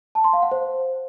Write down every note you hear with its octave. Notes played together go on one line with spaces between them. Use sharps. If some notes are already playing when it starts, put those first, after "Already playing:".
A5
C6
F5
F#5
C5